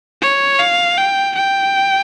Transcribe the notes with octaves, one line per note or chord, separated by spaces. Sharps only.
C#5
F5
G5
G5